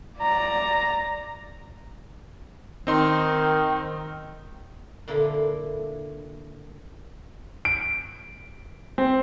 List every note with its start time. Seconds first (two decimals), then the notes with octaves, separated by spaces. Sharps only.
0.19 D5 A#5
2.87 D#3 C4 D#4 C6
5.08 A#2 D3 A#3 D4 E4 A4
7.65 D7
8.98 C4